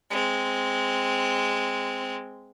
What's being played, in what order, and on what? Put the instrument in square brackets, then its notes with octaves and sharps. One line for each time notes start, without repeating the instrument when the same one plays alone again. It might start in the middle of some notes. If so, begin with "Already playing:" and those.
[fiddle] G#3 C4